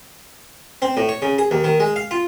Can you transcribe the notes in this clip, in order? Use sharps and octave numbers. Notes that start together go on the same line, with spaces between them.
C4
A2
C#5
C#3
G#4
D#2
D#3
G#3
F5
F4